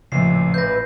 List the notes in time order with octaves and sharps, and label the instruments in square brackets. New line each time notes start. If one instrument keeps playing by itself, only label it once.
[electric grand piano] A1 A#2 E5 [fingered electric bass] C#3 F3 [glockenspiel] C7
[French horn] B4 [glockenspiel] G6 A#6